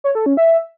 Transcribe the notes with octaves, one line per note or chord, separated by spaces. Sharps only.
C#5
A4
C#4
E5